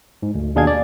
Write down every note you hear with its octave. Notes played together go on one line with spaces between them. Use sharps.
G#2
D2
D#2 B2 D4 G#4 F5 G#6
D5